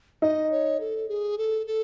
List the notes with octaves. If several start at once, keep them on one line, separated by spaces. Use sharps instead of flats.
D#4 D#5
C#5
A4
G#4
A4
A4